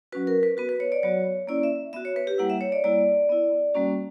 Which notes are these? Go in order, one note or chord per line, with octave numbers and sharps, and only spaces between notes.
F#3 C#4 F#4 B4
A#4
B4
B3 F#4 B4
B4
C#5
D5
F#3 B3 F#4 C#5
A#3 C#4 E4 D5
E5
B3 F#4 E5
C#5
B4
G4
G3 A#3 E4 F#5
E5
C#5
D5
G3 A#3 E4 D5
B3 E4
G3 A#3 C#4 F#4